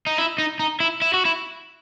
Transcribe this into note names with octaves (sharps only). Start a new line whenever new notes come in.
D#4
E4
D#4
D#4
E4
E4
F#4
E4